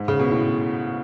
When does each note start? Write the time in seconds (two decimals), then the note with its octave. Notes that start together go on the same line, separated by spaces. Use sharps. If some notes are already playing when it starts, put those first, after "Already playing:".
Already playing: G#2
0.08 C#3
0.19 B2
0.31 A2